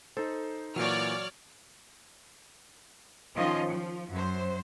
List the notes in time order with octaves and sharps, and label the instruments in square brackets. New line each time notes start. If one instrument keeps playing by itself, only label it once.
[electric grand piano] D#4 C5 [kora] A4
[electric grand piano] A#2 E3 [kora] F#3 [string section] C#5 D5 F6
[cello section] D#3 F3 C#4 F4 D#5
F3
F#2 C5